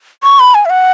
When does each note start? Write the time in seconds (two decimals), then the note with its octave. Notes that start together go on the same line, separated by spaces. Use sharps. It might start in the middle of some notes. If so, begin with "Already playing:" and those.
0.23 C#6
0.40 B5
0.54 G#5
0.65 E5
0.70 F#5